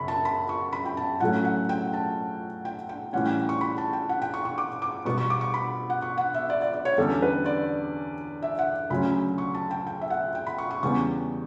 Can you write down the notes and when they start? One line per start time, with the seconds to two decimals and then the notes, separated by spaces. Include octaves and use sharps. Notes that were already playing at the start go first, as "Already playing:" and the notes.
Already playing: F#2 C#3 B5 C#6
0.08 A5
0.25 B5
0.49 C#6
0.73 B5
0.85 G5
0.97 A5
1.20 A2 F#3 A3 C#4 F#5
1.45 F#5
1.69 G5
1.94 A5
2.65 G5
2.89 G5
3.13 A2 E3 G3 C#4 F#5
3.26 G5
3.49 C#6
3.61 B5
3.78 A5
3.93 G5
4.09 F#5
4.22 G5
4.34 C#6
4.45 C#6
4.58 D6
4.82 D6
5.05 B2 G3 B3 C#6
5.18 C#6
5.30 D6
5.41 C#6
5.54 B5
5.90 F#5
6.02 C#6
6.18 F#5
6.34 E5
6.50 D5
6.62 D5
6.74 D5
6.85 C#5
6.98 E2 D3 G3 C#4 A4
7.22 B4
7.46 D5
8.42 E5
8.59 F#5
8.90 D2 C#3 F#3 C#4 B5
9.38 C#6
9.55 A5
9.71 G5
9.87 G5
10.01 E5
10.10 F#5
10.35 G5
10.47 B5
10.58 C#6
10.71 C#6
10.83 E2 C#3 G3 B3 C#6